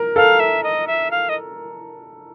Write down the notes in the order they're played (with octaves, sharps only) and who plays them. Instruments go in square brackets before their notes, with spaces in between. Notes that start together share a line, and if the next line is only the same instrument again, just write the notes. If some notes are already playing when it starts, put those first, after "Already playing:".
Already playing: [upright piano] A#4
[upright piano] A4 [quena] F5
[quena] E5
D#5
E5
F5
D#5